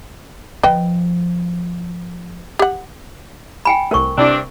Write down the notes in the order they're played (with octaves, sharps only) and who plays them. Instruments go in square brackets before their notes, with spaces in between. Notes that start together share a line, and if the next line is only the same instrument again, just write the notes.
[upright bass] F3 [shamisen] B4 D#5 G5
[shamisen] G4 F#5
[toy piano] G5 G#5 B5
[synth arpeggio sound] C2 A3 [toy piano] A#4 C5 C#6
[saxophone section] G2 C4 D4 [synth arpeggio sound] C3 E4